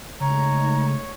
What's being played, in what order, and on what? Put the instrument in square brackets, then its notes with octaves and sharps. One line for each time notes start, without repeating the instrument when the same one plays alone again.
[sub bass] C#3 [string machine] G#3 A3 D#4 [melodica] C#5 [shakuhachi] A#5